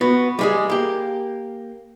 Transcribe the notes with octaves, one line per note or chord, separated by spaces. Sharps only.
B3 F#4
G3 G#3 G#4
A#3 G4